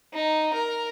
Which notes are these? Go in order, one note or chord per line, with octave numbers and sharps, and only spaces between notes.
D#4
A#4